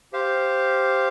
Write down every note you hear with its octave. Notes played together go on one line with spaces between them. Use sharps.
G4 C5 F5